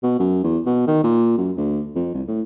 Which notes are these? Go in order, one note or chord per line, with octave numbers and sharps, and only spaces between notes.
B2
F#2
E2
B2
D#3
A#2
F#2
D2
F2
C2
A2